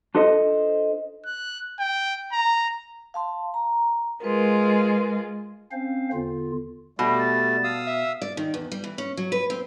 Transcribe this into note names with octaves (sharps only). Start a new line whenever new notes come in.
D4 F4 A4 C5 D#5
F#6
G5
A#5
F5 A5 C6
A#5
G#3 F4 G#4 A#4 B4
C4 C#4 C5 F5
E2 D3 F4
B2 G3 A3
A5
F5 D#6 E6
E5
D5
D#3
E2
G3
E3
C#4
F#3
B4
C4